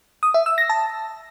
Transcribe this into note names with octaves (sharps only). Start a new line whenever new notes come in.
D#6
E5
E6
A#6
A5